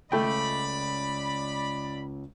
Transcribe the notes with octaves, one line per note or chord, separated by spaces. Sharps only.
C#2 A3 D5 G5 B5